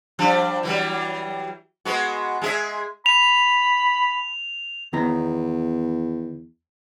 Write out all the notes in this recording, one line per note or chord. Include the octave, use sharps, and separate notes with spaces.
F3 G3 D4
E3 F#3 G3
G#3 B3 F#4
G#3 G#4 E5
B5 F7
E2 D#3 B3 A#5